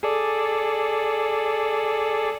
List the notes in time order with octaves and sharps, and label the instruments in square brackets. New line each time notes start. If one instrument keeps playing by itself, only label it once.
[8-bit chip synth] G#4 A4 D5